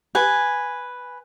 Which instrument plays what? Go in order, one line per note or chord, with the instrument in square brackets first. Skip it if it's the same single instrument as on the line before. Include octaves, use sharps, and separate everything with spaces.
[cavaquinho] B4 G#5